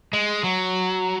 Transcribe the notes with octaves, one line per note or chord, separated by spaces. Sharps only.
G#3
F#3